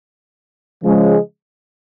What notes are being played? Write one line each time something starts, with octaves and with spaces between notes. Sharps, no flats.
C#3 F3 G#3 C#4